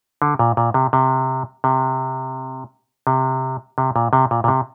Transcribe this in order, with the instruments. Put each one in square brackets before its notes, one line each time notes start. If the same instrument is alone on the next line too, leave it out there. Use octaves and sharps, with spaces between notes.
[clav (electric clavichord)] D3
A#2
A#2
C3
C3
C3
C3
C3
A#2
C3
A#2
A#2
C3